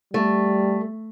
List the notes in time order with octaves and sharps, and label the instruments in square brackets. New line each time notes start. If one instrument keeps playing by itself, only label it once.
[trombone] G3 [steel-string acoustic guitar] A3